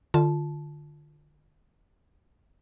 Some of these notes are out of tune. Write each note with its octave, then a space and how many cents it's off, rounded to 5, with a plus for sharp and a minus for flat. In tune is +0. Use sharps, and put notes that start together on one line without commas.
D3 +25 F4 +0 A5 -15